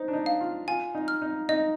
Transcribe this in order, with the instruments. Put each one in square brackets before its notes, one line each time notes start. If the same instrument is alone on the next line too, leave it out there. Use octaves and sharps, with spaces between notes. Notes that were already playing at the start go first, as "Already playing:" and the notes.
Already playing: [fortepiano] D#4 [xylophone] C5
[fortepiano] D4
D#4
[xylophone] F5
[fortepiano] F4
[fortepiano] F4 [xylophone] G#5
[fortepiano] D#4
[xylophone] F6
[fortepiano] D#4
[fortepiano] D#4 [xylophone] D#5